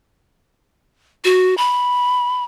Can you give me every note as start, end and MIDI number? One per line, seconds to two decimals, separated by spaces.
1.24 1.55 66
1.58 2.44 83